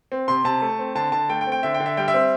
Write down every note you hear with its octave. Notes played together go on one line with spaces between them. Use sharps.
C4
C3 C6
C3 A5
A3
C4
D3 A5
D3 A5
A3 G5
G5
C4
G5
D3 E5
G5
D3
E5
G3 G5
E5
C4